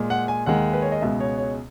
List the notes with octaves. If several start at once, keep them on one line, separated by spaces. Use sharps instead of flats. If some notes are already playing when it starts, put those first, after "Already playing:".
Already playing: A#2 G#3
F#5
G#5
D#2 D#3 G#3 F#5
B4
C#5
D#5
C#2 B2 G#3 E5
C#5
C#5